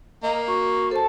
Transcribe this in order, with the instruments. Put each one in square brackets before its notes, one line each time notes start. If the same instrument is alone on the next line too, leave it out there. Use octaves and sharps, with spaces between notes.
[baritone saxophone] A#3 [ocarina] D#5
[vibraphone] F#4 [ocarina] C#6
[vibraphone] A4 A5 [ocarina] C5